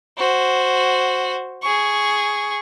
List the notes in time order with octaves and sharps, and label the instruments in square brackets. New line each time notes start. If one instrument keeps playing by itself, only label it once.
[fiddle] F#4 C5
G#4 C#6